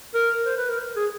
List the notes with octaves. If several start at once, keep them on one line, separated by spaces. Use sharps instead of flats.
A#4
C5
B4
A#4
G#4